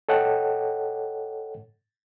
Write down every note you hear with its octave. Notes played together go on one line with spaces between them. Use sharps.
A4 C#5 D#5 F#5 G5